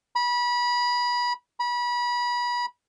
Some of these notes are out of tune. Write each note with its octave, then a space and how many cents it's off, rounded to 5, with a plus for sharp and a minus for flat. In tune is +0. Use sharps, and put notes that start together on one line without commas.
B5 -25
B5 -30